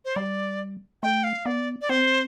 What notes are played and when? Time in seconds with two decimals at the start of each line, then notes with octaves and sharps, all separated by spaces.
0.05 C5
0.16 G3 D5
1.03 A3 G5
1.24 F5
1.46 B3 D5
1.81 D5
1.89 C4 C5